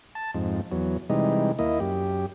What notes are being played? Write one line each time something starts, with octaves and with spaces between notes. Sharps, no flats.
A5
F2 G#2
E2 F#3
C3 E3 G3 G#3 D#4
D#2 A#3 E4 D#5
F#2 G4